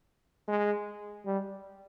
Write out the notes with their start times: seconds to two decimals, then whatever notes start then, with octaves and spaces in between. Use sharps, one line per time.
0.48 G#3
1.26 G3